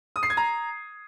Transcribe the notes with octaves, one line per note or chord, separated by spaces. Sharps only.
D#6
C7
G#6
A#5